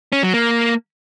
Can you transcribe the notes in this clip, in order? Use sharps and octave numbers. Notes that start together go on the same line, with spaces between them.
C#4
F#3
A#3